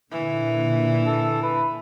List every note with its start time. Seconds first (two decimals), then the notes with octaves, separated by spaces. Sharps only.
0.12 A#2 D3 E3
1.06 A4
1.43 B4